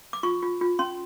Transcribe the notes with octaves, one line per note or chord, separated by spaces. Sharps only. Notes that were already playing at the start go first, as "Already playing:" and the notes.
D6
F4 C#6
F4
F4
C#4 C6